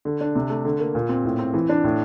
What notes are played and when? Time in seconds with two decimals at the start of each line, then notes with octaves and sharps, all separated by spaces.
0.05 D3
0.21 D4
0.36 C3
0.50 A3
0.65 D3
0.80 A#3
0.95 A#2
1.09 C4
1.25 A2
1.39 C4
1.54 E3
1.69 D4
1.84 A2